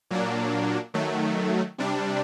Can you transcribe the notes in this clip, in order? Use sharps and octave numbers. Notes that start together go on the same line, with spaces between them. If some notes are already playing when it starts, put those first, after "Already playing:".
A#2 F#3 A#3 D4
D#3 F#3 A3
C3 G3 D4